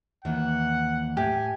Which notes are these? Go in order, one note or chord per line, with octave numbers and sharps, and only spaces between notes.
D#2 E3 F#5
A2 G4 G#5